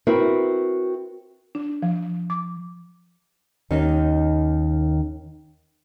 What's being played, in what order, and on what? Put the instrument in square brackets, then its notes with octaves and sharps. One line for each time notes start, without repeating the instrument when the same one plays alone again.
[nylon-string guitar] C4 E4 F#4 A#4 B4
[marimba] D4
F3
D6
[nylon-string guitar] D#2 D#3 C#4 D#4